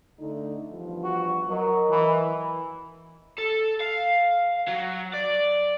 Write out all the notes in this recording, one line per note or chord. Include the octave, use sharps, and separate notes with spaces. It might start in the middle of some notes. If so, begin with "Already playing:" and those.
D3 A3 D#4
E2 G2 F3
F#4
F#3 A#4 D#5
E3
A4
F5
F#3
D5